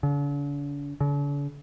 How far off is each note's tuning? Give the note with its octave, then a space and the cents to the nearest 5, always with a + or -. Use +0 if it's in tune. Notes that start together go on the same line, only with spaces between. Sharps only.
D3 -45
D3 -45